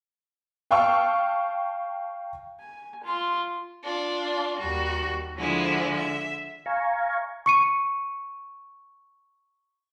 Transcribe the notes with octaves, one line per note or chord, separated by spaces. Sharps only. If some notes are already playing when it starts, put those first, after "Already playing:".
F5 G5 A5 C#6 E6 F6
G#5
F4 C6
D4 F4
D#2 G3 F#4
D3 F3 G#3 E4
E5
F5 G#5 A#5 C#6
C#6 C#7 D#7